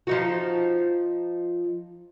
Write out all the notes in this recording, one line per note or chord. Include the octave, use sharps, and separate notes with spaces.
F3 D#4 F#4